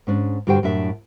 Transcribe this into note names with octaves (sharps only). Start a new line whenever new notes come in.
G#2 C#4 D4
G2 D3 F#4 G4 C5 G5
F#2 A2 D4 E5